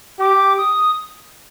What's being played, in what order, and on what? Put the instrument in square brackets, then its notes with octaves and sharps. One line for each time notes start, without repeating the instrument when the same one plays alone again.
[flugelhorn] G4 [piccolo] D6
[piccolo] D#6